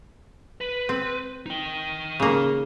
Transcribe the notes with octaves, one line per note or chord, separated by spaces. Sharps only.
B4
C4
D#4 G5
C#3 A#3